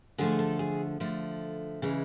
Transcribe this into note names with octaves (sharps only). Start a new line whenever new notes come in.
D3 F3 A3 G#4
A4
G#4
D3 F3 A3
C#3 E3 G#3